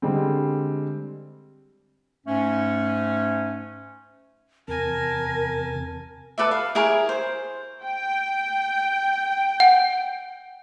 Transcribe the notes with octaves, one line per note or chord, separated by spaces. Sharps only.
D3 G3 G#3 C4
G#2 A3 C#4
E2 C3 A#4 G#5 A5
A4 B4 D5 E5
F5
E4 G#4 A#4 C#5
C5
G5
F#5